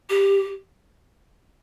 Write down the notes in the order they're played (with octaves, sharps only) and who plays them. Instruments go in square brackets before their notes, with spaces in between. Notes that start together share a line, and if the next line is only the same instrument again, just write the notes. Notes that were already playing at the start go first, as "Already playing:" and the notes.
[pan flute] G4